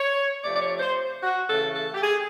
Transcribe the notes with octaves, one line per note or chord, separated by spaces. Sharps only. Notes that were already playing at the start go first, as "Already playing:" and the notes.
Already playing: C#5
C3 F3 A3 D5
D5
C#5
C5
F#4
C#3 E3 A3 A4
A4
G4
G#4